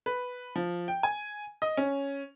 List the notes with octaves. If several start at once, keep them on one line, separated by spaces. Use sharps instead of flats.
B4
F3
G5
G#5
D#5
C#4